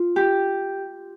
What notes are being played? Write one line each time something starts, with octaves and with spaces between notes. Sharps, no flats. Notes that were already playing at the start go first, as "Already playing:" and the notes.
Already playing: F4
G4